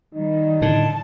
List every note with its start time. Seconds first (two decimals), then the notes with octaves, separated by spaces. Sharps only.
0.14 D#3 G3 D#4
0.62 A2 D3 A5